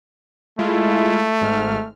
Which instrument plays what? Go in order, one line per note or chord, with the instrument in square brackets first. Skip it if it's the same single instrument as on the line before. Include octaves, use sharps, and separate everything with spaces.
[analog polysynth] G#3 E4 F4 [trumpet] A3
[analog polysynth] G#1 G#2 F6